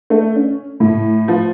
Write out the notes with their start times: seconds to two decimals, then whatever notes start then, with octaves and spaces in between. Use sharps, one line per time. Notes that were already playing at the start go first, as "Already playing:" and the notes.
0.10 A3
0.36 C#4
0.80 A2
1.28 F3